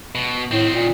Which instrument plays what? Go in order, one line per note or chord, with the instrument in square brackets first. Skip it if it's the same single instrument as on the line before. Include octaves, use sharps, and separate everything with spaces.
[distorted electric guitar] B2
[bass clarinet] A2 [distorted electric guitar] D#3 C4
[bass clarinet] A#2